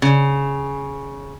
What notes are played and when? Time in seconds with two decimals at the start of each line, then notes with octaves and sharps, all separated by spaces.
0.02 C#3